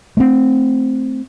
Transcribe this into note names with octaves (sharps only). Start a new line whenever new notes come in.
A3 A#3 C4